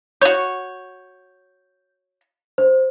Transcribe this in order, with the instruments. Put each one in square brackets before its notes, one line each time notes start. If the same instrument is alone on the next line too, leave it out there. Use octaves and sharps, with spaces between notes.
[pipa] F#4 C#5 [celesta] G6
[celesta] C5